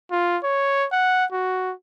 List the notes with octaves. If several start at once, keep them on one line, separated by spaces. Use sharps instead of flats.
F4
C#5
F#5
F#4